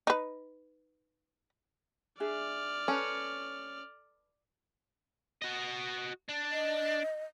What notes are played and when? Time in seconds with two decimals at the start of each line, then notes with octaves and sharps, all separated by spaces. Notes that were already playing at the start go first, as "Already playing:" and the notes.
0.07 D#4 B4
2.20 D4 G#4 D5 E5 F6
2.88 C#4 A4 B4
5.42 F#4 D#5
6.29 D4
6.51 D#5